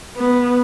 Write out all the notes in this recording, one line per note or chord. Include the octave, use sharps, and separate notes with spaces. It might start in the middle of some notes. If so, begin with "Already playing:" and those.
B3